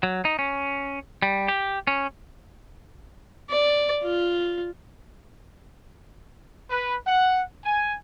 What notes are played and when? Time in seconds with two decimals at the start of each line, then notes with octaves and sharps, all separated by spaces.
0.03 F#3
0.25 D#4
0.39 C#4
1.22 G3
1.48 G4
1.87 C#4
3.50 D5
4.03 F4
6.69 B4
7.05 F#5
7.64 G#5